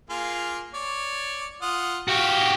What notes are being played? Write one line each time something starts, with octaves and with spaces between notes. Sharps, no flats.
A#3 F4 G#4
C#5 D5
F4 F#5 D#6
F#4 G4 F5 C#6